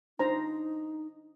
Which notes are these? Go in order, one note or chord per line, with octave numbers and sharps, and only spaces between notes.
D4 D#4 C5 A#5